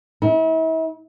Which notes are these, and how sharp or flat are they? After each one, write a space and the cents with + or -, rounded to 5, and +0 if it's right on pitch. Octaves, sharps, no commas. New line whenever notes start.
E4 -40